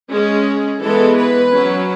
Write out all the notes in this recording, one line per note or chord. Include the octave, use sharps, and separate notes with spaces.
G#3 C#4 G#4
E3 G#3 B3 A4
B4
F#3 C#4